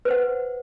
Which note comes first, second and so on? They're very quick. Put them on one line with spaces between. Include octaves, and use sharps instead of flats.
B4 C5 F#5